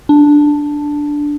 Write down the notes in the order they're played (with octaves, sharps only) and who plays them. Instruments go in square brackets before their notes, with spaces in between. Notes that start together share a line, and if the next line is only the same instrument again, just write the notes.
[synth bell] D4